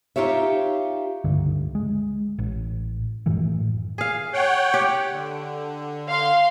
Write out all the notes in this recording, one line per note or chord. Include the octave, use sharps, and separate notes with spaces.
D#4 F4 G4 C#5 E5
C#2 G2 D3
G#3
A1
F#2 A2 D#3 E3
G#4 F5
C#5 F#5 G5
G4
D3
F5 C6